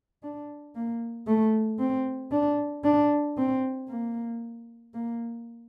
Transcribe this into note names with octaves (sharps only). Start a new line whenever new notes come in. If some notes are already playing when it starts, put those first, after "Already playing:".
D4
A#3
A3
C4
D4
D4
C4
A#3
A#3